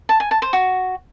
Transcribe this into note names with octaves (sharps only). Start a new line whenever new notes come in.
A5
G#5
A5
C5
F#4